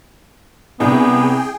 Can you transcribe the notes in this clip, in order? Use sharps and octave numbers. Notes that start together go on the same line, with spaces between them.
C2 C3 B3 D4 G#4 G5